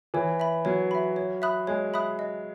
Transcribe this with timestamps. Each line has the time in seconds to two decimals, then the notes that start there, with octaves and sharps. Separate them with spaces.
0.14 E3 C#5
0.40 E5 B5
0.65 F#3 C#5
0.91 E5 B5
1.16 C#5
1.42 E5 B5 D#6 F#6
1.67 G#3 C#5
1.94 E5 B5 D#6 F#6
2.19 D#5